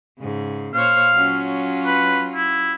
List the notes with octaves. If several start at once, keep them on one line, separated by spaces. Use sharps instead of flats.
G#2 C#3
A#2 C5 C#5 F5
F#3 C#4 F4
B4
E4